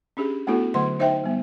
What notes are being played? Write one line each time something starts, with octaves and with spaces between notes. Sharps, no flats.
C#4 D4 G4 G#4
A3 B3 D4 E4 F#4 A4
D3 F#3 A3 F#5 C6
D#4 C5 D#5 E5 G5
G3 B3